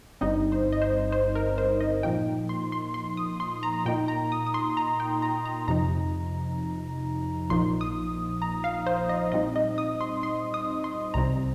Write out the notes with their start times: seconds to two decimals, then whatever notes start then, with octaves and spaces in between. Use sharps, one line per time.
0.21 G1 G2 G3 C4 D#4 D#5
0.52 C5
0.72 D#5
0.82 C5
1.12 C5
1.35 A#4
1.58 C5
1.80 D#5
2.03 A#2 F3 A#3 D#4 G5
2.49 C6
2.72 C6
2.94 C6
3.17 D#6
3.40 C6
3.63 A#5
3.86 A#2 A#3 D#4 G5
4.08 A#5
4.32 D#6
4.46 D#6
4.54 C6
4.77 A#5
5.00 G5
5.22 A#5
5.45 A#5
5.68 F2 C3 F3 D#4 A#5
7.50 A#1 A#2 F3 A#3 D#4 C6
7.81 D#6
8.42 A#5
8.64 F5
8.86 C5
9.09 D#5
9.32 A#2 G3 C4 D#4 D#5
9.56 D#5
9.78 D#6
10.01 C6
10.23 C6
10.54 D#6
10.84 C6
11.14 C2 C3 G3 C4 A#5